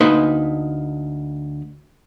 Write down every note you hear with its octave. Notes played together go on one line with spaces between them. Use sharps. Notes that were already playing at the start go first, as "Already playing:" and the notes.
D2 A#3 D#4 B4 C6